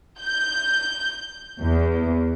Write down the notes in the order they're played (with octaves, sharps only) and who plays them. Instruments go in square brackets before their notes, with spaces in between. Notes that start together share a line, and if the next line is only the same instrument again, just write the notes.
[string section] G6
E2